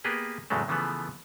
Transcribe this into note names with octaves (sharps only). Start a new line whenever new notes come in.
A#3 B3 G4 G#4 B4
E2 A2 C#3 F#3 G#3 A3
C#3 E3 F3 A3 B3